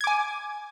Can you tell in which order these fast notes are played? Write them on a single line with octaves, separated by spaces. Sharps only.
G#6 D6 G#5